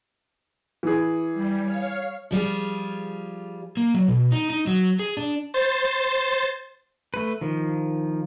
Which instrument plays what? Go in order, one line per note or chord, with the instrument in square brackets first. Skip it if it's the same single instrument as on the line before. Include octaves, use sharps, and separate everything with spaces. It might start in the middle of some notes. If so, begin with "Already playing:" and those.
[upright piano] E3 G#4
[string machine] G3
C#5 F5
[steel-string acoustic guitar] F3 G3 F4 G#4
[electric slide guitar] A#3
F#3
B2
D#4
D#4
F#3
G#4
D4
[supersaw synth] C5 A6
[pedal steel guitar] A3 B4
D#3 F3